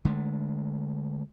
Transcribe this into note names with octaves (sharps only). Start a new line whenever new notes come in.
D3 G#3 A3